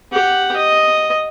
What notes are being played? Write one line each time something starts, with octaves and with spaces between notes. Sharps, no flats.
G4 F#5
D#5